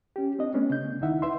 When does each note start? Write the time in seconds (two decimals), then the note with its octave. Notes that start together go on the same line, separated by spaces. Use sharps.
0.16 C#4 G4
0.39 C4 D4 D#5
0.54 A3 B3 C#4 D4
0.70 C#3 G6
1.01 D2 D#3 D#4 E4 E5 F#5
1.22 B4 E5 C6